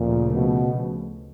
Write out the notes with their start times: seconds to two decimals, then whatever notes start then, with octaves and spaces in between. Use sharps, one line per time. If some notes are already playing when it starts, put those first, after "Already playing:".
Already playing: D2 A#2 C#3 F3 A3
0.33 B2